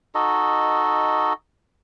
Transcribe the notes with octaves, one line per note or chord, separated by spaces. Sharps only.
D#4 F#4 A4 D#5